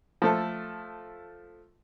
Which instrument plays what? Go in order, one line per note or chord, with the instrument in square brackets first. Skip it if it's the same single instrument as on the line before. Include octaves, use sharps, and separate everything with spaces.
[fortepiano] F3 A3 A4